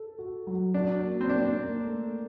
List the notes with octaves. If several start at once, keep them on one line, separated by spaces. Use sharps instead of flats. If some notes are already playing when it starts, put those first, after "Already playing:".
Already playing: A4
F#4
F#3
D4 F#4
A#3
C4
A#3 D4
A#3
A3